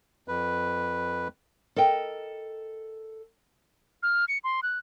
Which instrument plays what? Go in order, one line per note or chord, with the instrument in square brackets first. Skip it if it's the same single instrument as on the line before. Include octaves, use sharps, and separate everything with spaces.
[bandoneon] F2 B4
[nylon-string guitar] A4 A#4 D#5 G5
[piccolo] F6
C#7
C6
F#6